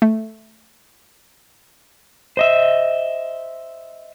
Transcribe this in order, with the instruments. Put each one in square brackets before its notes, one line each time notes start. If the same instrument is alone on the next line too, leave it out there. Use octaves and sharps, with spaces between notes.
[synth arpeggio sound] A3
[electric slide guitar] C5 D#5 E5